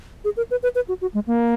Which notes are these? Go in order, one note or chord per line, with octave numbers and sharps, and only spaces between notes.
G#4
A#4
B4
B4
B4
F#4
F#4
G#3
A#3